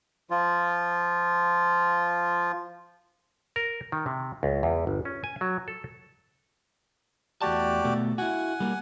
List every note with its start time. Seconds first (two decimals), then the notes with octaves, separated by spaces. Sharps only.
0.30 F3 F4
3.56 A#4
3.92 D#3
4.06 C3
4.43 C#2
4.63 E2
4.87 G1
5.05 C#4
5.24 G#5
5.41 F#3
5.68 A4
7.42 E2 A3 F#4 G4 D5 A5
7.84 B2 A3
8.18 E4 F#4 F#5 G#5
8.60 G3 A#3